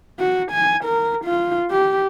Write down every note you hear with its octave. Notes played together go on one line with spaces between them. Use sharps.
F#4
G#5
A#4
F4
G4